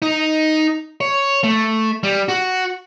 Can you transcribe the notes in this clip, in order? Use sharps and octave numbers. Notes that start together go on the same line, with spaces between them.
D#4
C#5
A3
G3
F#4